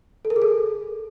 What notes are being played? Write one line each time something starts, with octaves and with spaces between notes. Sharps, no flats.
A4
A#4
G#4
A4